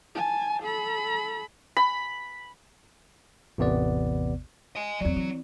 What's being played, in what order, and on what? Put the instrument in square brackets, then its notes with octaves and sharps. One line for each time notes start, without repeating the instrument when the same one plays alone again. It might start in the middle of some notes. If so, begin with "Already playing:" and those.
[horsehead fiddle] G#5 A5
A4 B5
[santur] B5
[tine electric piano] A1 E2 C3 B3 D5
[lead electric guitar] D#5 G#5
[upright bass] G1 E2 [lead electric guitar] F#3 [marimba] C4 D5
[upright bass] E3